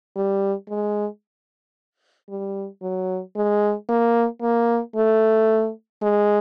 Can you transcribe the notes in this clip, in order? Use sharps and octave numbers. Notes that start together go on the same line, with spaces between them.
G3
G#3
G3
F#3
G#3
A#3
A#3
A3
G#3